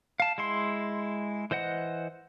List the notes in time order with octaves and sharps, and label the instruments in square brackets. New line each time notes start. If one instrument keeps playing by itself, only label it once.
[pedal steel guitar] F5 A5
G#3 E4 C6
E3 C5 D#5 F#5